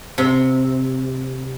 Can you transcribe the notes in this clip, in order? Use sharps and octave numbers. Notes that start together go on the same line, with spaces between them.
C3